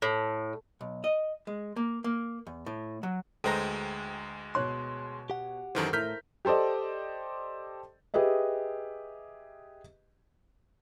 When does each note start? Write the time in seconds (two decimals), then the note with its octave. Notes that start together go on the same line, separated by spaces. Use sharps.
0.02 A2
0.81 B1
1.04 D#5
1.47 G#3
1.76 A#3
2.04 A#3
2.47 E2
2.66 A2
3.03 F#3
3.44 D2 G#3 A4 B4 C5 G5 A#5 A#6
4.55 B2 C#5 C6 F#6
5.30 G4 F#5
5.75 F#2 D#3 E3 A4 A#4 C5
5.93 A2 E4 A#4 F6 G6 B6
6.45 G4 A4 C5 D5 D#5
8.14 G4 G#4 B4 D#5 E5